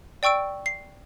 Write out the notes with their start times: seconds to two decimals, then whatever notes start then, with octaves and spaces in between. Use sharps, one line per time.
0.23 D5 G5 C#6 E6 D7
0.66 C7